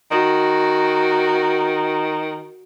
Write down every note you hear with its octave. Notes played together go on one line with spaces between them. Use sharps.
D#3 F#4